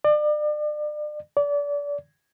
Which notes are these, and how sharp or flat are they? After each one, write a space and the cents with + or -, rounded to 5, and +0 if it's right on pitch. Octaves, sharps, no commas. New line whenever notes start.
D5 +35
D5 -30